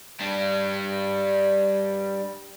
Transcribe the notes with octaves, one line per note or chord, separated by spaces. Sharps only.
G3 D4